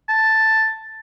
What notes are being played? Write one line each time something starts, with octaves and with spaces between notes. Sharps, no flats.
A5